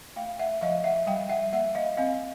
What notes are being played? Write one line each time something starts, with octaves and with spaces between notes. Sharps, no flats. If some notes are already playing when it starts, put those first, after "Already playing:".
A3 F5 G5
E5 F#5
F3 D#5 F5
E5 F#5
G3 F5 G5
E5 F#5
A#3 E5 F#5
D#5 F5
C4 D#5 F5